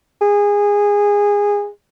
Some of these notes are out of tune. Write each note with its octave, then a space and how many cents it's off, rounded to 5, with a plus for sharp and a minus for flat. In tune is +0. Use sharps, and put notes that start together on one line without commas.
G#4 -20